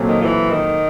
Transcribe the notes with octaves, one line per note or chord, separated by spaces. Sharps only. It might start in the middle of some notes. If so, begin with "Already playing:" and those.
Already playing: A#2 F#3 A3 C4
D#3
F3
E3
D#3